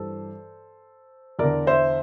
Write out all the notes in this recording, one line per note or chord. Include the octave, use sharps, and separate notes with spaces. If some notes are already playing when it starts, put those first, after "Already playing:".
Already playing: G2 E3 A4 C5
E2 D3 A#4 D5
C5 E5